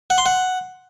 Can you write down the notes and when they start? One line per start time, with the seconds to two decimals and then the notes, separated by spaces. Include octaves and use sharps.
0.10 F#5
0.18 C6
0.26 F#5